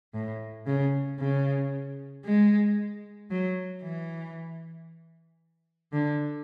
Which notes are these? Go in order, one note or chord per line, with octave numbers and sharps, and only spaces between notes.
A2
C#3
C#3
G#3
F#3
E3
D3